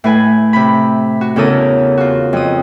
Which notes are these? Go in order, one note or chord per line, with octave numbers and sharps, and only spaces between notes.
A2 B4 G#5
C3 B5
F#4
E2 C#3 A4 A#4 D#6
F4 F#4
F2 D#6